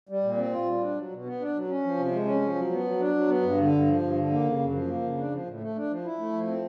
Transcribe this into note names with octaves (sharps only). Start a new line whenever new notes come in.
G3
A#2
C4
F4
G3
D4
F#3
B2
B3
D4
F#3
C#4
F3
C3
G#3
C#4
F3
F#3
B3
F#3
D4
F#3
B3
G2
D3
G2
F3
G2
D3
A#3
C#3
F#2
F3
A#3
C#3
D4
F3
A2
A3
D4
F3
E4
A3
F3
C4